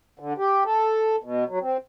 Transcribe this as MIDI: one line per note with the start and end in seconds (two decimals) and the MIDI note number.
0.19 0.33 50
0.38 0.64 67
0.65 1.16 69
1.24 1.44 47
1.49 1.59 54
1.61 1.77 60